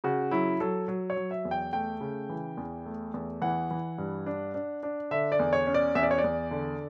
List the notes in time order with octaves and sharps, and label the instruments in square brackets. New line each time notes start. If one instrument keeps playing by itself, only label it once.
[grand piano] C#3 F#4
F#3 E4
F#3 A4
F#3
C#5
F#3
E5
E2
G5
A3 G5
C#3
E3
E2
A3
E2
E3 F#5
E3
G2
D4
D4
D4
D3 E5
D5
E2
C#5
C#4
D5
E2 E5
D5
C#5
D5
E2
D3